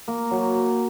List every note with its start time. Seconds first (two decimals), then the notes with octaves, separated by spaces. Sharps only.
0.08 A#3
0.31 F#3